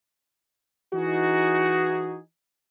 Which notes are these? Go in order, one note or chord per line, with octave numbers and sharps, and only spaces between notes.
E3 D#4 F#4 G#4